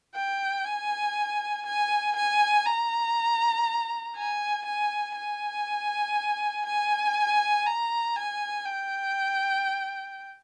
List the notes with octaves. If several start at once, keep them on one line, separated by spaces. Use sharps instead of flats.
G5
G#5
G#5
G#5
A#5
G#5
G#5
G#5
G#5
A#5
G#5
G5